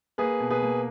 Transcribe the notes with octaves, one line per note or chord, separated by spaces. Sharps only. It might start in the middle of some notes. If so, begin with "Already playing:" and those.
A#3 G#4 B4
B2
G#4 B4
A#3